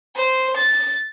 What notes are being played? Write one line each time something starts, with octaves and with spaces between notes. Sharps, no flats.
C5
A6